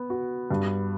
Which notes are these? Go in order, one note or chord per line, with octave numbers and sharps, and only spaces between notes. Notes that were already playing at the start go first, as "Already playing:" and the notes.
Already playing: B3
F#4
G2